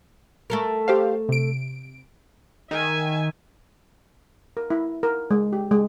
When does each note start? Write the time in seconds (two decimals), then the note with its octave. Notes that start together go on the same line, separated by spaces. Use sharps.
0.50 A3 A4 A#4
0.88 G4 C5 F5
1.29 C3 D7
2.71 D#3 E5 G#5
4.57 A#4
4.70 E4
5.03 A#4
5.31 G#3
5.53 G4
5.71 G#3